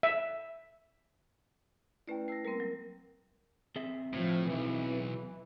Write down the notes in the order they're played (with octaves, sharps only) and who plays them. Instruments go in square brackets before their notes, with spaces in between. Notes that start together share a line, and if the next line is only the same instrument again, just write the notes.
[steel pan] E5
[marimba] A3 C#4 D5 [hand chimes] E4 B4 G5
[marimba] A5 E6 [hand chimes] A#6 C7
[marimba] G3 A#3 C4 [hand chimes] A#4
[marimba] F#3
[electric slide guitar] C4 G#4 E5
[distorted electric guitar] A2 [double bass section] F3
[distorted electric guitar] B1 [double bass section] E3